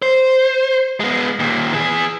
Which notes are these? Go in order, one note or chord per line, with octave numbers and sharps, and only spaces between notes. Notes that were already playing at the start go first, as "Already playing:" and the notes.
C5
G#3 B3
D#2 A#2
E3 G#4